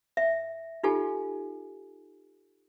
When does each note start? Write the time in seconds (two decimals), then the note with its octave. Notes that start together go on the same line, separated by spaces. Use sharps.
0.17 E5
0.83 D#4 F4 G4 A4 G#5